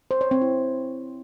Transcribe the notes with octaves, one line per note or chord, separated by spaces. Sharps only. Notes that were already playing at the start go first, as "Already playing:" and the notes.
C5
C#5
C4
E4